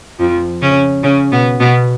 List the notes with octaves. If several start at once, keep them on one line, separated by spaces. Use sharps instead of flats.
F2 F3
C#3 C#4
C#3 C#4
B2 B3
B2 B3